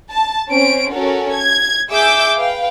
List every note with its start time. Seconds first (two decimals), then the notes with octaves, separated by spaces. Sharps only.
0.11 A5
0.49 C4 C#4 C5 D7
0.92 C#4 F#4 A4 A#4
1.35 G#6
1.90 G#4 E5 D6 E6 G6
2.36 B4 F5 G5